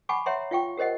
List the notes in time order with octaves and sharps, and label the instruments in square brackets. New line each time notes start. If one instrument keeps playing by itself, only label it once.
[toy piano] F#5 G#5 B5 C#6 D6
C#5 E5 F#5 A#5 C6
F4 F5 G5 C#6
G4 A#4 C5 D#5 F#5